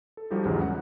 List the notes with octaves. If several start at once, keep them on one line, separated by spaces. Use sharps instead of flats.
A4
F3 G3 D#4 F#4 G4 A4
B1 E2 G#2 C#3
F#5